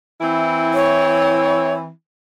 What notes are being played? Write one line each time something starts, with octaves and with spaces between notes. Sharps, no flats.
E3 C4 E4
C#5